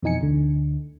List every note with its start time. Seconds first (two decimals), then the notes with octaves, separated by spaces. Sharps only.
0.02 F2 B2 E3 D#4 G#5 C#7
0.21 D2 D3